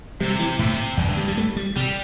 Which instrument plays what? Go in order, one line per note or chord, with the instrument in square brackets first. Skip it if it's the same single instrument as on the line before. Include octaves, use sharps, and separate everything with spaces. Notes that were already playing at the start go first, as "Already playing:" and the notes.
[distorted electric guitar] C3 [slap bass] G3
[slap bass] E3
[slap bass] A2 [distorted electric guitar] C3
[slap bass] E2 [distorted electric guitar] G2
[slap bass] D3
G3
G3
A3
G3
[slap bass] C3 [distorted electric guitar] G3